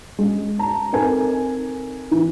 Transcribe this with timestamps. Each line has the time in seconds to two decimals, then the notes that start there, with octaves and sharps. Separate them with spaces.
0.19 G#3 C#4
0.59 A5 A#5
0.93 C4 D#4 A4 A#4 G#5
2.11 E3